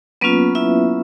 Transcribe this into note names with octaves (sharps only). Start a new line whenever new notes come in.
F#3 A#3 B3 C#4 F4 B4
E4 E5